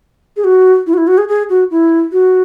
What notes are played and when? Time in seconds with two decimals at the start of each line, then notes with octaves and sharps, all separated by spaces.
0.37 G#4
0.44 F#4
0.87 E4
0.94 F#4
0.97 E4
1.07 F#4
1.18 G#4
1.28 G#4
1.50 F#4
1.71 E4
2.12 F#4